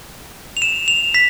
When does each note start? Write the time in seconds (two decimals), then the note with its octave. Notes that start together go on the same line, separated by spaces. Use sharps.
0.57 F7
0.62 E7
0.88 F7
1.14 B6